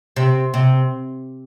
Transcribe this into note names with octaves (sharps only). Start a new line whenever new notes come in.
C3
C3